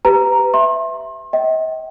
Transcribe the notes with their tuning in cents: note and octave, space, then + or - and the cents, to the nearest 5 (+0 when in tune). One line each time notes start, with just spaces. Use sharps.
G4 +0 B4 +20 A#5 +0
E5 +0 C6 +35
D#5 +45 G5 -30